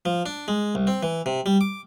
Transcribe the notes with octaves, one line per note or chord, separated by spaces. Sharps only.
F3
D4
G#3
C2
C4
E3
C3
G3
D6